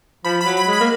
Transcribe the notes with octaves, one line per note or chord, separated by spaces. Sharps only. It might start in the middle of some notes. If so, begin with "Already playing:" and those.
F3 B5
B5
F#3
B5
G#3
B5
A#3